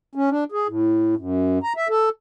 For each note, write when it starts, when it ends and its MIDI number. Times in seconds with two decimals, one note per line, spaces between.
0.15 0.30 61
0.30 0.44 62
0.52 0.67 68
0.68 1.15 45
1.17 1.59 42
1.63 1.73 82
1.77 1.88 76
1.89 2.09 69